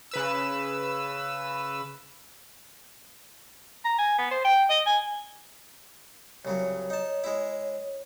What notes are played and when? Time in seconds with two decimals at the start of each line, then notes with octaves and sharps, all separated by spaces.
0.11 C#3 B4 E6
3.85 A#5
3.98 G#5
4.18 B3
4.31 C5
4.45 G5
4.70 D#5
4.86 G#5
6.45 C2 C#3 F#3 C#5
6.90 D#4 A5
7.24 G#3 E4